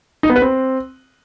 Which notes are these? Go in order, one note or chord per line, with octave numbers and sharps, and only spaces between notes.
D#4
B3
B4
C4